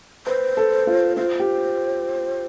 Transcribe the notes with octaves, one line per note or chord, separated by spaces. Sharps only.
B4 C5
A4
F4
F4 C5
G4